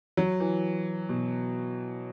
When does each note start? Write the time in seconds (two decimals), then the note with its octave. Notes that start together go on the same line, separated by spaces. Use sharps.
0.17 F#3
0.40 E3
1.09 B2